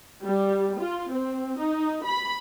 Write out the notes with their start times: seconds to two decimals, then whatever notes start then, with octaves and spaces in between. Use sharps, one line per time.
0.24 G3
0.80 F4
1.13 C4
1.59 D#4
2.06 B5